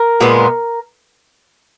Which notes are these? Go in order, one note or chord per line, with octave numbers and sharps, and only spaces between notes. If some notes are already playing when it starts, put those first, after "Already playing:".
Already playing: A#4
A#2 G#3 B3